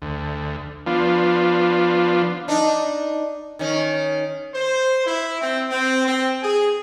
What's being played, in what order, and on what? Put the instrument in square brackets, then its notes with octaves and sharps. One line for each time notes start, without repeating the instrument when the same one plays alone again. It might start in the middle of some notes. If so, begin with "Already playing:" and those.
[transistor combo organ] D2
F3 B3 D4 F4
[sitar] D4 D#4
D#3 C#4
[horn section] C5
E4
C4
C4
C4
G#4